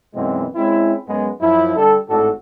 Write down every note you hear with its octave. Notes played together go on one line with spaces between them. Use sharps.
F#2 B2 D#3 E3 G#3 C4
G#3 C4 C#4 E4
F#2 G#3 B3
F#2 F3 E4
D3 G3 A4
G#1 A2 D4 F#4 A4